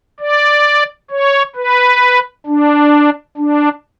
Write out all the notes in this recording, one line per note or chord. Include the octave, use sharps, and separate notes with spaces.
D5
C#5
B4
D4
D4